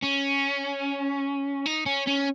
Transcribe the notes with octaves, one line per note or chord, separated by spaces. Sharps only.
C#4
D#4
C#4
C#4